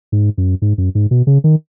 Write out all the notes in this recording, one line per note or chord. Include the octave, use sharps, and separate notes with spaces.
G#2
F#2
G#2
F#2
G#2
B2
C#3
D#3